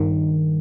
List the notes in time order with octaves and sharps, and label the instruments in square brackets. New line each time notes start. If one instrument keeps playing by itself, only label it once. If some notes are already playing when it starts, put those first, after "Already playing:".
Already playing: [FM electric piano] G2 D#3